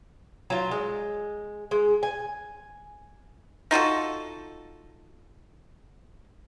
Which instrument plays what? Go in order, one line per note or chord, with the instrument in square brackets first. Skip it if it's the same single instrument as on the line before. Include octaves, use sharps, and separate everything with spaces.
[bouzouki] F#3 F4
G#3
G#3
G#5
[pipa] D#4 F4 F#4 A4